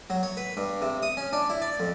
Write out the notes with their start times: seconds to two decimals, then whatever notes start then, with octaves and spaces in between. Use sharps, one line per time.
0.10 F#3
0.23 C#5
0.37 B4
0.57 G2
0.82 C3
1.03 D#6
1.17 C#4
1.33 D4
1.50 E4
1.62 D5
1.80 F2